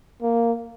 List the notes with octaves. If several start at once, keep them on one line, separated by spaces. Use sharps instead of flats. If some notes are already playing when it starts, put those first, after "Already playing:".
A#3